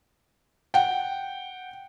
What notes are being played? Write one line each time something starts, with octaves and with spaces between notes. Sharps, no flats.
F#5 G5